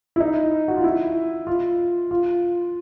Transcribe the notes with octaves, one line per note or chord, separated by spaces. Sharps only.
E4
D#4
F#4
F4
E4
F4
F4